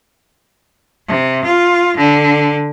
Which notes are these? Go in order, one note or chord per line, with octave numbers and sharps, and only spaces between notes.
C3
F4
D3